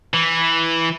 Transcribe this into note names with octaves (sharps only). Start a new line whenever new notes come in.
E3